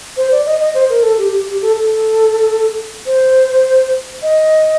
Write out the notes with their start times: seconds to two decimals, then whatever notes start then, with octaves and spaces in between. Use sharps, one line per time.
0.17 C5
0.31 D5
0.46 D#5
0.60 D#5
0.74 C5
0.89 A#4
1.03 A4
1.18 G4
1.32 G4
1.47 G4
1.62 A4
1.76 A4
3.06 C5
4.22 D#5